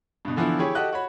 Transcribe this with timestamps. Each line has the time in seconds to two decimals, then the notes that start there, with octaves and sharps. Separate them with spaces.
0.25 G2 B2
0.36 D3 E3 F3 B3 E4
0.59 E4 G4 G#4 C#5
0.75 F#4 G4 A4 D#5 F#6
0.93 F#4 C#5 B5